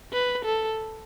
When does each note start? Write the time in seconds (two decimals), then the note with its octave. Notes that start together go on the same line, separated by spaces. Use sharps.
0.13 B4
0.45 A4